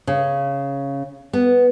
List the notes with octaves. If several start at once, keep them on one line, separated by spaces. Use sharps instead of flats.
C#3
B3